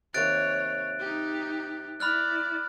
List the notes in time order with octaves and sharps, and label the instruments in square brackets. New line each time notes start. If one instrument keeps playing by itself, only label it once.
[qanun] C3 D#3 A#3 [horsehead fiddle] C#5 [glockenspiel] F#6 A6 D7
[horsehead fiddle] D#4 G4
[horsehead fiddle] E4 D5 [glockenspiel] B5 F6 F#6